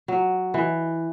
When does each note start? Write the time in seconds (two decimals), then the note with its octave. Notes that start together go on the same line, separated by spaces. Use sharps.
0.08 F#3
0.54 E3